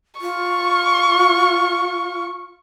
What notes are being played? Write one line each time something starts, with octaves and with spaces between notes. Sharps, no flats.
F4 C#6